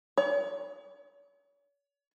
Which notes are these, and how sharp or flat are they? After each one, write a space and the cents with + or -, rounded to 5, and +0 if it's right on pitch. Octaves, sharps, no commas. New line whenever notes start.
C#5 +40